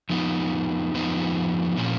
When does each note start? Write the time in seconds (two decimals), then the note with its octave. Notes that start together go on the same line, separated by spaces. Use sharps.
0.10 F2 F3 B3 D#4
0.94 F2 F3 B3 D#4
1.77 A#2 F3 A#3 C#4